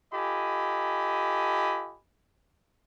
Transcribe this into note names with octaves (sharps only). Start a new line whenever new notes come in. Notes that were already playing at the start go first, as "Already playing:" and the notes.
F4 G4 A4 D#5 G#5 B5